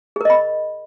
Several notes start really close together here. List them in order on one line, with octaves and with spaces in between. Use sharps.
G#4 A#4 D#5 B5